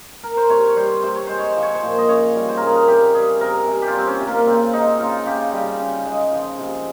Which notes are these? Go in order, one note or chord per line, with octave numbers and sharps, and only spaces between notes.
A#4
C5
C3 C#5
C#5
G3 C5
C3 C5
C#5
G#3 C5
C#5
C5
F3
C#5
C5
A#2
D#5
C#3 C#5
G3
C5
C#3 A#4
G#4
A#4
C3 G4
G3 G#4
C3 A#4
C3
G4
F4
G3 C4
C#4
C3
A#3
C#3 C4
G#3 D#4
C#3 F4
C#3 G4
G3
C#3
G#3
F3
C3